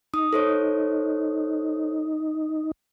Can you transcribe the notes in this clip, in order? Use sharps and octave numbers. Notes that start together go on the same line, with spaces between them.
D#4 D#6
A4 C5 C#5